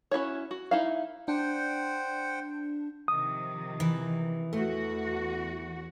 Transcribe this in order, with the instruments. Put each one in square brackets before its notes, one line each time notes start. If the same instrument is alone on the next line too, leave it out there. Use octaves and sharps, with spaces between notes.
[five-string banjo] C#4 E4 F#4 C#5
F#4
D#4 E4 F5
[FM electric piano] D4 [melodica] C5 F#5 G5
[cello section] C3 D#3 F3 [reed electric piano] D#6
[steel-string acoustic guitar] E3
[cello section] E2 F#4 [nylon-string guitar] A3